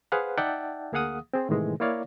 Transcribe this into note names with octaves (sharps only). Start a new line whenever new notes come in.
G#4 B4 C5 F5 F#5
D#4 D5 E5 F#5 G5 A5
D2 A#3 G#4 F5 F#5 D#6
C4 G#4
A2 C3 D#3 E3 G#3
A#3 E4 C#5 D5 F5